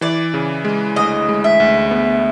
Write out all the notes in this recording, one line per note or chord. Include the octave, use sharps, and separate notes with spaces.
E3 D5
C#3
G#3
D2 D#5
G#3
E5
D2
B3